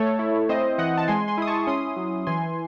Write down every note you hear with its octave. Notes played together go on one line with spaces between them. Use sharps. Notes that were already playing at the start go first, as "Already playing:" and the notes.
Already playing: A3 A4 C#5
E4
C4 C5 D#5
E3 D#5 F#5
A5
G#3 G#5 C6
G#5 C6
E4 D#6
A5 C#6
C#4 C6 D#6
F#3
E3 G#5 C6